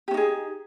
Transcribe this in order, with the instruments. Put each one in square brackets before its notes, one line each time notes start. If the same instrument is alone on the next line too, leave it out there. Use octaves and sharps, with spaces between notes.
[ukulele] G4
C#4
D#4
G#4